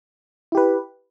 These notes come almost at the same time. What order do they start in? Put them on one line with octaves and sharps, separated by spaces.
E4 G4 B4